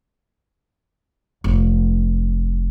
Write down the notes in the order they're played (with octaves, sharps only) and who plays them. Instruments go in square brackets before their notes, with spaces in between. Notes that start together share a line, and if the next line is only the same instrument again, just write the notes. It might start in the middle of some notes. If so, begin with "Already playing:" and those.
[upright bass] F1